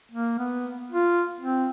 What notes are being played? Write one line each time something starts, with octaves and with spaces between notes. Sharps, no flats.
A#3
B3
F4
C4